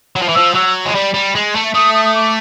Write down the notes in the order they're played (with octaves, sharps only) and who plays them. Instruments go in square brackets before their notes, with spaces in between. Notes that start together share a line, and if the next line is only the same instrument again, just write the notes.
[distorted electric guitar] F#3
F3
E3
[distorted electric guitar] F3 [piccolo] E6
[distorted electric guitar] F#3 [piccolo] E6
[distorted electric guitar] G#3
G3
G3
G#3
A3
[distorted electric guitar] A3 [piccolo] D#6
[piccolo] D#6
D#6
D6